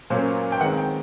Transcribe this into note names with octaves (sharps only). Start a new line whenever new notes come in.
A#2 F#3 A#3 C#4 C5
G5
D#3 G#3 C4 F#5
G5